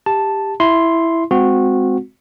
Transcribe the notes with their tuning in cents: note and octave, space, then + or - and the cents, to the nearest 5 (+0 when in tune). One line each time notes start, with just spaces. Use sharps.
G4 +15 A5 +0
E4 +0 C6 +0
G#3 +0 C4 -20 F#4 -20